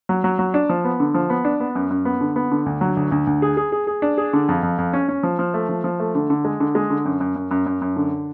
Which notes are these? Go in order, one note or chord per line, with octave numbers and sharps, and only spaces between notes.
F#3
F#3
F#3
D4
F3
B3
D3
F3
B3
D4
B3
F#2
F#2
B3
D3
B3
D3
D2
F#3
D2
D2
D2
G#4
G#4
G#4
G#4
D4
G#4
D3
F2
F2
F2
C#4
C#4
F3
F3
A3
F3
F3
A3
D3
D3
G#3
D3
G#3
D3
F#2
F#2
F#2
F#2
F#2
F#2
D3